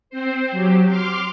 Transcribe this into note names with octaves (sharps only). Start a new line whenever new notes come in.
C4 C5
F#3 G4
C6 D6 F6